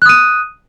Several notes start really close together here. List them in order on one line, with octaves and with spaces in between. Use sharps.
F#6 D#6 D#7